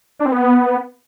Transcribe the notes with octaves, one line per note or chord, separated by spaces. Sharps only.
D4
C4
B3